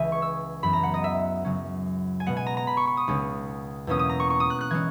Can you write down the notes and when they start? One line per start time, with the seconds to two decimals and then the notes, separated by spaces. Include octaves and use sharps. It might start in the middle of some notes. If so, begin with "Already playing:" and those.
Already playing: C#2 C#3 E3 E5 G#5
0.12 C#6
0.22 E6
0.63 F#2 E3 B3 B5
0.73 A#5
0.83 F#5
0.94 D#5
1.04 E5
1.45 F#2 C#3 F#3 C#4
2.20 G#5
2.26 B2 G#3 B3 F#5
2.37 G#5
2.47 A#5
2.57 A#5
2.67 B5
2.77 C#6
2.87 C#6
2.97 D#6
3.08 C#2 C#3 G#3 C#4
3.87 E2 B2 A#3 C#4 D#6
3.99 D#6
4.09 A#5
4.20 C#6
4.30 C#6
4.40 D#6
4.50 F#6
4.61 F#6
4.70 E3 G#3 C#4 G#6